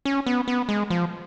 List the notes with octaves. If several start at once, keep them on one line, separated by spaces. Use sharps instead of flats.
C#4
B3
B3
G#3
F3